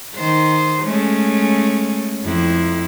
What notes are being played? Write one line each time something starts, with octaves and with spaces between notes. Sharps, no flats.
D#3 C5
G#3 A3 C#4
F2 E4